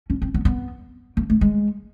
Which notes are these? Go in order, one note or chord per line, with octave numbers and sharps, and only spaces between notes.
C#4
C4
B3
B3
A#3
A3
G#3